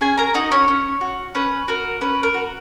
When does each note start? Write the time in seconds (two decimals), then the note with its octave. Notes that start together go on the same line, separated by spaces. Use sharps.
0.01 C#4 G#4 G#5
0.18 A#4 A#5
0.34 D#4 F#4 D#5
0.51 C#4 C#5
0.68 C#4
1.01 F#4
1.35 C#4 B4
1.68 F#4 A#4
2.01 C#4 B4
2.23 A#4
2.34 F#4